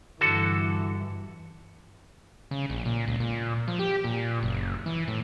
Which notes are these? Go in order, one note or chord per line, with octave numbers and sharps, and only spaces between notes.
G2 D3 E3 F#4 A4
C#3
A#1
A#2
C#2
A#2
F3
G4
A#2
F#1
E3
A2